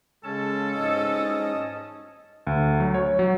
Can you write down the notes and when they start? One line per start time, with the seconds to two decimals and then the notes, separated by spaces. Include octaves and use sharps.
0.24 C#3 G#3 C#4 A4 A5
0.76 G#2 D#5
2.47 D2
2.80 F#3
2.94 C#5
3.19 F#3